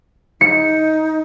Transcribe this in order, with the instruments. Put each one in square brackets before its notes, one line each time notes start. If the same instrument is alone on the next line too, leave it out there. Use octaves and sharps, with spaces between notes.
[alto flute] D#4 [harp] C#7